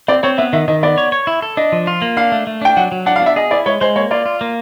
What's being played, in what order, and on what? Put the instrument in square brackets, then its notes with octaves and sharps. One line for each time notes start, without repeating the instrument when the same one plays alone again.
[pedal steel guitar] C4 [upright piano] D5
[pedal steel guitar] C4 [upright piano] C#5
[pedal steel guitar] B3 [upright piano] E5
[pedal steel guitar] D#3 [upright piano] E5
[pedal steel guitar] D#3 [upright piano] D#5
[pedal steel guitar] B3 [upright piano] D5
[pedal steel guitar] C#5
C#5
E4
A4
[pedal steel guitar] D4 [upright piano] D#5
[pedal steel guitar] F3
F4
A#3
[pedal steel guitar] D4 [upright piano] F5
[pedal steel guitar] A3
A3
[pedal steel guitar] D4 [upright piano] G5
[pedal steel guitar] F#3 [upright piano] F#5
[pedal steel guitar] F#3
[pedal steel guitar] D4 [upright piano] F#5
[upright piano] F5
[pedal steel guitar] B3 [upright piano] E5
[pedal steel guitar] G#4 [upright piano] D#5
[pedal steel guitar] E4 [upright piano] D5
[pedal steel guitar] G#3 [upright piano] C#5
[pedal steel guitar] G#3 [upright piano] C5
[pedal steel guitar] A#3 [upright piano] C#5
[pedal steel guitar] F4 [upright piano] D5
[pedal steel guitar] F4
A#3